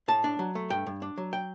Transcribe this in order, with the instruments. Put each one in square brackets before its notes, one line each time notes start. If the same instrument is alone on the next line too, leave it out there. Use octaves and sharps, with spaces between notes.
[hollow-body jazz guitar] A2 A5
D4
F#3
A3
G2 G5
G2
D4
F#3
G5